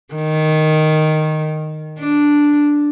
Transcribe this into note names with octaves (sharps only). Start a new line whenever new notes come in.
D#3
D4